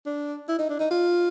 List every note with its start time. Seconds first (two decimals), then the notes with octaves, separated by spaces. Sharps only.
0.06 D4
0.48 E4
0.59 D#4
0.69 D4
0.80 D#4
0.91 F4